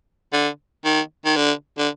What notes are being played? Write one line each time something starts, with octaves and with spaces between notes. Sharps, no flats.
D3
D#3
D#3
D3
D3